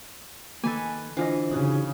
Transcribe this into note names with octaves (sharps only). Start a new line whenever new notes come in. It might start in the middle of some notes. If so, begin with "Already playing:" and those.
D#3 A#3 A4 B4 G#5
D3 E3 D4 F4 C5 D#5
C#3 D#4 F#4 G#4